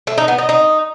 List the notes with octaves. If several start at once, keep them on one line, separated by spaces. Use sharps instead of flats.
A3
D#4
B3
D#4
D#4